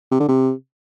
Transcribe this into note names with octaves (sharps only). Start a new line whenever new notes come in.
C3
D3
C3